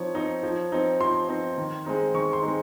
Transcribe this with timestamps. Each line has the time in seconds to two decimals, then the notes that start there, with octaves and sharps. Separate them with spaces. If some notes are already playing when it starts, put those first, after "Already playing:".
Already playing: F3 C4 D#4 C#5
0.15 C4 D#4
0.43 F3
0.72 C4 D#4
1.01 F3 C6
1.29 C4 D#4
1.58 D#3
1.86 G#3 C4 D#4
2.14 D#3 C#6
2.33 C6
2.42 G#3 C4 D#4